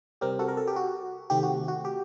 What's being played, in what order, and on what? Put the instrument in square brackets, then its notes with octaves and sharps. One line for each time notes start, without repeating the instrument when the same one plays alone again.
[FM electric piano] C3 G3 C4 G4 A#4
F#4 A4
A#4
A4
G4
F#4
C3 D#3 A3 C4 G4
F#4
F#4
G4